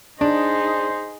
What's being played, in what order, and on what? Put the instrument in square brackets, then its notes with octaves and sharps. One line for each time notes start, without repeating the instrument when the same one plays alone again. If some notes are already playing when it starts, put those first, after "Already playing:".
[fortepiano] D4 [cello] D#4 G#4 [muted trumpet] C5